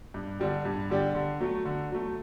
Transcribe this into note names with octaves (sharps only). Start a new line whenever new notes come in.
G2
D3 G3 D4 G4
G2
D3 G3 D4 G4
D3
F#3 A3
D3
F#3 A3